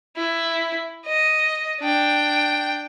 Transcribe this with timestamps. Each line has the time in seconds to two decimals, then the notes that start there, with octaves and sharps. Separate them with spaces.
0.16 E4
1.06 D#5
1.80 D4 G5